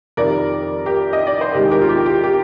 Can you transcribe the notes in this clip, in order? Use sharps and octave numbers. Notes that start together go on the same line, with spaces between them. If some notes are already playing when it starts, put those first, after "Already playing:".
F2 D#3 G3 A#4 D5
G4 A#4
D#5
D5
C5
D#2 D#3 G#3 G4 A#4
G4 A#4
F4
G4
G4
G4